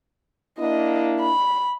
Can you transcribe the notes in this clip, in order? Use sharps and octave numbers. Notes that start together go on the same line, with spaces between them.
A#3 D4 E4 D#5
B5